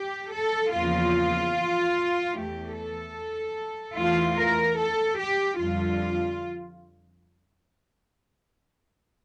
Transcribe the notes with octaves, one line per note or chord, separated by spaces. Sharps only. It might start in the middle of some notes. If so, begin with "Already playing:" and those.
Already playing: G4
A4
E2 C#3 F3 A#3 F4
E2 E3 A3 G4
A4
E2 E3 A3 F4
A#4
A4
G4
F2 D3 G3 F4